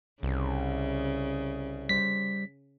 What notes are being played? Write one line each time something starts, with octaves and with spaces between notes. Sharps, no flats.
C2 C#3
G3 C5 B6